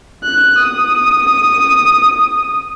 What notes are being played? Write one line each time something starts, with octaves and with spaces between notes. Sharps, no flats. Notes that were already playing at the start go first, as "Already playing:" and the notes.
F#6
D#6